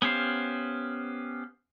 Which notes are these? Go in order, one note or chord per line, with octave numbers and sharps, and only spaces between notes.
B3 C#4 G4 C5 F5